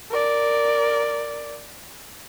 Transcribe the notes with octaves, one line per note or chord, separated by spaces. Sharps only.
A#4 D5